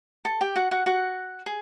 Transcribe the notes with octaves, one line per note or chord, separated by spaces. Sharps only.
A4 A5
G4 G5
F#4 F#5
F#4 F#5
F#4 F#5
G#4